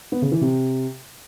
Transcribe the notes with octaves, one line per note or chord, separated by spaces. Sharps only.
B3
C#3
E3
C3